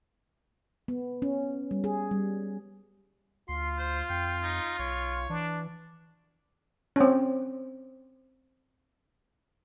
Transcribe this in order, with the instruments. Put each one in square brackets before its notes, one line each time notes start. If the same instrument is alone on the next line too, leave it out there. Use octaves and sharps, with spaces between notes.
[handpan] B3
C#4
G3
G#4
G3
[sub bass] D2 [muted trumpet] F4 [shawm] C6
[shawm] C5
[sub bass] F2 [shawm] G5
[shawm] D#4
[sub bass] B1 [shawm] C#5
[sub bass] E3 [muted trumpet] D4
[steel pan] C4 C#4